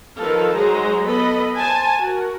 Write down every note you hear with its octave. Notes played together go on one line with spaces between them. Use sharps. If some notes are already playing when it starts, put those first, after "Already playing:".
D#3 F3 D#4 A4 B4 F5
F#3 G#3 G#4 C5 A#5
B3 A4 D#5 B5
C5 G#5 A5
F#4 A#4